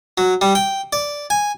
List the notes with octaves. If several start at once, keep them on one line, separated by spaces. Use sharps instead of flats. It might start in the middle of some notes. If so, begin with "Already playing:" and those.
F#3
G3
G5
D5
G#5